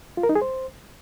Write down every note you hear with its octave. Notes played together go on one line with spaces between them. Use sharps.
F4
A#4
D#4
G#4
C5